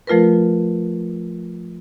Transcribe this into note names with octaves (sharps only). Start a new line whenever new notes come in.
F3 A3 F4 A#4 B4